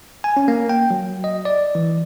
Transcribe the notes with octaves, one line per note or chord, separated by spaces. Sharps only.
G#5
C#4
A#3
G5
F#3
D#5
D5
E3